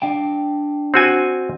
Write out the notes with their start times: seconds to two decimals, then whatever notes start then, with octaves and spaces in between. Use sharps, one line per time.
0.02 D4 F5 G5
0.94 C4 F#4 G#5